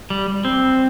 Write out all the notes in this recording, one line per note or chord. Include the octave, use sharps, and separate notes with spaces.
G3
C4